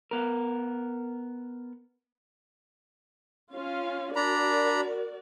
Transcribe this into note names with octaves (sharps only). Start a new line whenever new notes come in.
B3 A#4
C#4 F4 F5
D4 F#4 A#4 D5 A#5 B5